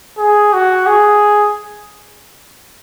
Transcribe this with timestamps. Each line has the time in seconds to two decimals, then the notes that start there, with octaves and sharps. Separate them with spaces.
0.18 G#4
0.53 F#4
0.87 G#4